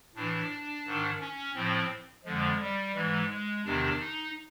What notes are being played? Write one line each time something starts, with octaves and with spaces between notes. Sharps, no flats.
A2 E3 D4
G#2 D#3
C#4
A2 F3 C4
F2 D3 F3 G#3
G3
G#2 E3 G#3
G#3
E2 C3 D#3 D4
D#4